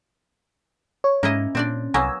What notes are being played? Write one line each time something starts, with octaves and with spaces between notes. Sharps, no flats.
C#5
G#2 A#3 C#4 E4 D#5
A#2 C4 D4 D5
C2 F#3 A#3 B3 G#5 E6